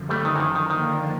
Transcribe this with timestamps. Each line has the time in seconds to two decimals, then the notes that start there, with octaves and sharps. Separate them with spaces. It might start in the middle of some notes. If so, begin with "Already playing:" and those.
Already playing: F#2 D3 F3
0.09 G3 A3
0.25 D#3
0.35 E3
0.40 D#3
0.55 D#3
0.70 D3 D#3 F3 A#3 D4